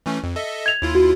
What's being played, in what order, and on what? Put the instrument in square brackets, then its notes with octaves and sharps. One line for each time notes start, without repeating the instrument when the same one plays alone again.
[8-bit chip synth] E3 A3 C#4
F2
A4 D#5 E5
[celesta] G#6 F7
[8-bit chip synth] D#2 E4 F4
[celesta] F#4